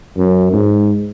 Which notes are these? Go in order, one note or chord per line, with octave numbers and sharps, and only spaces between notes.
F#2
G#2